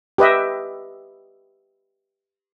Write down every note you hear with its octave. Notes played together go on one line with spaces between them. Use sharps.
G4 B4 D#5 E5